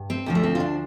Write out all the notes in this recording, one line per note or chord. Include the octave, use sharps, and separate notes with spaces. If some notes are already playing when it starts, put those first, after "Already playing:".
Already playing: G2
C4
D2 D3 F3
A3
C4
F4
D4